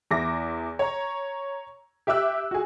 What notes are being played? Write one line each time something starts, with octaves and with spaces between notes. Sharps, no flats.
E2 E4 D6 A#6
C#5 A#5
G4 E5 D6 E6 F#6
F#4 G#4